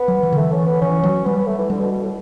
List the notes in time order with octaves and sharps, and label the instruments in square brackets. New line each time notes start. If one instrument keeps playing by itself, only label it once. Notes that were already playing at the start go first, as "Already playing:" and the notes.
Already playing: [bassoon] B3
[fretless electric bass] F#3
E3
D3
[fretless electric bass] E3 [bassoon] A3
[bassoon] C#4
B3
[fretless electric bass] E3 [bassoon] C#4
[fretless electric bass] F#3
[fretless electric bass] G3 [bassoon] B3
[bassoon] B3
A3
E3
[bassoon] D3 [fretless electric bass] G3
[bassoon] B2
B2
A2